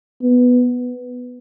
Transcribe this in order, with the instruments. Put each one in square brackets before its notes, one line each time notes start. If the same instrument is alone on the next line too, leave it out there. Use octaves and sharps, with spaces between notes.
[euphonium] B3